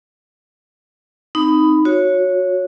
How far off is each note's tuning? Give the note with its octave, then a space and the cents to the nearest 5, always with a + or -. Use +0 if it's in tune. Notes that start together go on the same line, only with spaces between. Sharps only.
C4 +0 D#4 +0 B5 +15
F#4 -20 C#5 +0